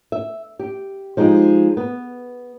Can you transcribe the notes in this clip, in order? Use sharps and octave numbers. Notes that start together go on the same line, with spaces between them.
E5
G4
F3 G#3 D#4 G4
B3